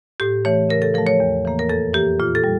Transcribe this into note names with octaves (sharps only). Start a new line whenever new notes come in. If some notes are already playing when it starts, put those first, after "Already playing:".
A2 G4
E3 A3 C#5
C#3 A#4
A4
F3 A3 A#4
C#5
E2
E3 A#3
A#4
F2 A4
E3 A#3 G4
A#2 F4
A4
G3